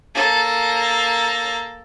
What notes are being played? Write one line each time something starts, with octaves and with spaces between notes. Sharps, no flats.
A#3 A4